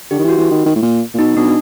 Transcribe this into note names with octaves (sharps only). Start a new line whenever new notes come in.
D3 G4
D#3
E3
F#4
E3
D#3
D#3
A2
A#2
A#2
B2 D#4
B2 D4